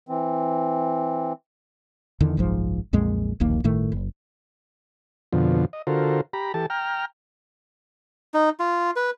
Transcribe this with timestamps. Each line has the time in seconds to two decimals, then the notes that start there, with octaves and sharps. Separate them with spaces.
0.09 E3 C4
2.20 E2 D3 D#3
2.37 F#1 B1 G#2 F3
2.93 B1 F2 A#2 G#3
3.40 D1 A#1 D#2 A#3
3.64 G1 A2 D#3 A3
3.92 F#1
5.33 F2 B2 D3 F3
5.73 D#5
5.87 D3 F4 F#4 A4 A#4 C5
6.33 G4 A#5 B5
6.54 E3 G4 A4 A5
6.70 G5 A#5 F6
8.34 D#4
8.59 F4
8.96 B4